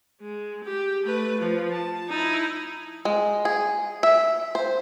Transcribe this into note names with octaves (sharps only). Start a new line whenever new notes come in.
G#3
G4
A3 B4
F3
A5
D#4 E4
G#3
G#4
E5
C5